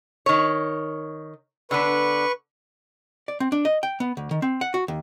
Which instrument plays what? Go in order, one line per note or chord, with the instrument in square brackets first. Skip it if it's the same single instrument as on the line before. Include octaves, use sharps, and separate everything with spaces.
[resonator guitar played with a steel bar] D#3 C#5
[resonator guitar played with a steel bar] D3 B3 D4 [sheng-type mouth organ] B4 C#6
[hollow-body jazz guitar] D5
C4
D4
D#5
G5
B3
D2
D#3
C4
F#5
F#4
D#2